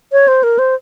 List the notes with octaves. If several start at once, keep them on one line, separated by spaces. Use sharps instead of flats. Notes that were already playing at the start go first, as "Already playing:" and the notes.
C#5
C5
A#4
C5